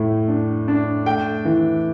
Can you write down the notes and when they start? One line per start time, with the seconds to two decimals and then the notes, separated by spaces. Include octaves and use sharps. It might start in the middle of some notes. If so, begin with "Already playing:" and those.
Already playing: A2 A3
0.28 D4
0.68 D4
1.06 A3 G5
1.45 E3